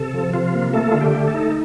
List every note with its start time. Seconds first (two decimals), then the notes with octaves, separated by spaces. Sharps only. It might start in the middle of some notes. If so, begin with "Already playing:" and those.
Already playing: C3 A4
0.14 F3
0.34 C3 F4
0.54 A#3
0.74 A3 A4
0.92 D3 F4
1.01 G4
1.15 A3
1.27 A4
1.34 D#4